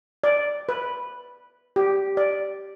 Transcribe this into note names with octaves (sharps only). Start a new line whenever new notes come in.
D5
B4
G4
D5